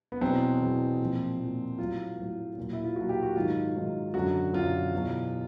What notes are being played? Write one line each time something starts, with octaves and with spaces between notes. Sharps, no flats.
B3
E2 B2 F#3 C4
E2 B2 F#3
A#2 F3
A#2 F3
A2 F#3 F4
A2 F#3
A#2 F#3
E4
F4
A#2 F#3 F#4
G4
F#4
G#2 D#3 F#3 F4
G#2 D#3 F#3
F#2 D3 F#3 F#4
F#2 D3 F#3 F4
E2 B2 F#3